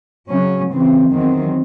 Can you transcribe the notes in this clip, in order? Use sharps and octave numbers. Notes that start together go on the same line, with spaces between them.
C#3 F#3 C#4
C#3 E3 C4
E2 D#3 F#3 C4